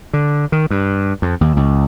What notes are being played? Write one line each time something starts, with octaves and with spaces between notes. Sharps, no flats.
D3
D#3
G2
F2
D#2
C#2